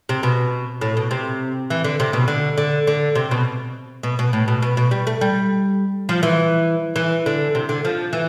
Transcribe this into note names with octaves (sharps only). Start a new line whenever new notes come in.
C3
B2
A2
B2
C3
E3
D3
C3
B2
D3
D3
D3
C3
B2
B2
B2
A2
B2
B2
B2
G3
A3
G3
F3
E3
E3
D3
C3
D3
F3
E3